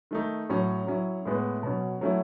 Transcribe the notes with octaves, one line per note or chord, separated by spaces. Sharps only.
D#3 A3 D#4
A2 F#3 C#4
F#3 C#4 E4
A2 G#3 B3 E4
B2 F#3 C#4
F#3 A3 C#4 E4